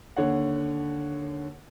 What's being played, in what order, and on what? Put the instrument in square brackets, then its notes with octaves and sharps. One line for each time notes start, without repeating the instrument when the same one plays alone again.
[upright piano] D#2 D3 C#5 F#5